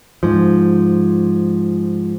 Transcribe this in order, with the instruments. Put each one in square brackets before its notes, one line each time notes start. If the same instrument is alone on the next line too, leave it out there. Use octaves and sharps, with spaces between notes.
[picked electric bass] G#2 F3